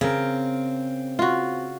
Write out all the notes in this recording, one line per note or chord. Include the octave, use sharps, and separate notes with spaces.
C#3 C4 A#4
F4 F#4